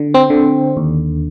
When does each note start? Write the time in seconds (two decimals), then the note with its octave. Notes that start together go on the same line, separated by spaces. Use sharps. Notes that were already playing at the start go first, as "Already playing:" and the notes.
Already playing: D3
0.14 C4
0.30 D3
0.77 D#2